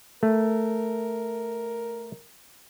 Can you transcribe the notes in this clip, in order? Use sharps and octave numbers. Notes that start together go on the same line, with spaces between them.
A3 A#4